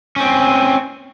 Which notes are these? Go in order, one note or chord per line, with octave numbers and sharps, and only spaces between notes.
C4 C#4